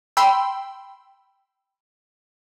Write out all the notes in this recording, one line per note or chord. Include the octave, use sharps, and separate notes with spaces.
G5 B5 C6 E6